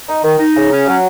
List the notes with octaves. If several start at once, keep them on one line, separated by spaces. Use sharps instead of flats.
D#4
D#3
D#4
C#3
C#4
F#3